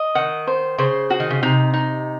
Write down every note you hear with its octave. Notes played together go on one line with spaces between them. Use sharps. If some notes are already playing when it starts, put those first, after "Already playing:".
Already playing: D#5
D#3 F#5
C5
C#3 C5
F#4
D#3
C#3
C3 D#4
D#4